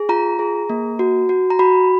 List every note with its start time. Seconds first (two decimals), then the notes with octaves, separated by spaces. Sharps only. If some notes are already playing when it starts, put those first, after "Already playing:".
Already playing: G#4
0.09 F4 A#5
0.39 G#4
0.70 A#3
0.99 F#4
1.29 F#4
1.50 A#5
1.59 F#4 B5